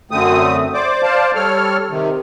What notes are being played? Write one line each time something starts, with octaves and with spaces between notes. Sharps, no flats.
F#2 D3 A3 C4 D#6
C5 D5 D6
C5 D5 F5 A5
G3 A4 C#5 F6
C3 D#3